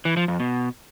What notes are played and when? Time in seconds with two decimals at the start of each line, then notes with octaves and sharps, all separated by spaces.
0.05 E3
0.17 F3
0.28 F2
0.40 B2